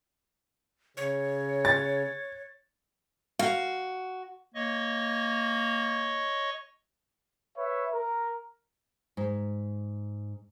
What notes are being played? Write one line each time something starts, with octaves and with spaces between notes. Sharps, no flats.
C#3 C#5
A6
F#4 F5
A#3 C#5 D#5 C#6
B4 C#5 E5
A#4
G#2